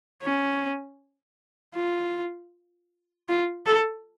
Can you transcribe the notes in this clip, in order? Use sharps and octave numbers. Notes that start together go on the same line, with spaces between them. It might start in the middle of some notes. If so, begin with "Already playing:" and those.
C#4
F4
F4
A4